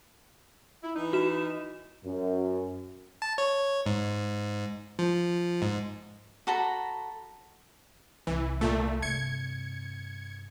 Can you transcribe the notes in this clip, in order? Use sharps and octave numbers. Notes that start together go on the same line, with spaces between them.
E4
E3 D#4
F#4 E7
F#2
A5
C#5
G#2
F3
G#2
F#4 A4 A#5 B5
C2 E3
A#2 A3
G2 C3 G#6 C#7